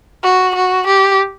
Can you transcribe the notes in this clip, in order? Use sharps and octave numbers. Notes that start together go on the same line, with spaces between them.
F#4
F#4
G4